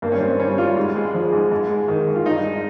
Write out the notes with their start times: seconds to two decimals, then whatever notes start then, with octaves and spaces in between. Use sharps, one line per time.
0.02 G2 A#3
0.12 C#4
0.20 G2 C4
0.39 G3 C#4
0.58 G3 F4
0.76 G#2
0.95 G#3
1.14 F3
1.32 G#2
1.51 G#2
1.70 G#3
1.88 D#3
2.08 G#2
2.15 F4
2.26 G2 D#4
2.45 G#3